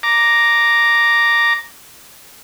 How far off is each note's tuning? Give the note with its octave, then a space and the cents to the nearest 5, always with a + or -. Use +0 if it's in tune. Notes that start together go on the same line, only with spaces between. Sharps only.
A#5 +0 D6 +0